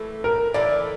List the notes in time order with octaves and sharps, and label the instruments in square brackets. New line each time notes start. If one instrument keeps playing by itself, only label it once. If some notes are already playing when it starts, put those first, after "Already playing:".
Already playing: [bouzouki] A2 E3 A3
[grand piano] A#4
[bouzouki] A2 E3 A3 [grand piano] D5